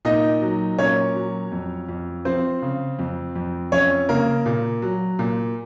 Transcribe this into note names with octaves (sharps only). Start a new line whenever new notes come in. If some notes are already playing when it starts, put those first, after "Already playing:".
A#2 D#4 D#5
F#3
A#2 C#4 C#5
F#3
F2
F2
F3 C4 C5
C#3
F2
F2
F2 C#4 C#5
C#3 A#3 A#4
A#2
F#3
A#2